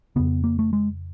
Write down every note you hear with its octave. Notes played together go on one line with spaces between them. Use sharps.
F2 C#3 B3
A#3
A3
G#3